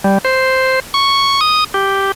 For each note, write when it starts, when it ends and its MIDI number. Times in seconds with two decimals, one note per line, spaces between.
0.04 0.18 55
0.25 0.80 72
0.94 1.40 85
1.41 1.64 87
1.74 2.12 67